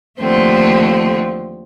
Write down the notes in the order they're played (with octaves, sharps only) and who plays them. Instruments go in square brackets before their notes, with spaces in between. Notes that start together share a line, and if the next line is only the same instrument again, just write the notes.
[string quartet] D#2 D3 F3 A3 C4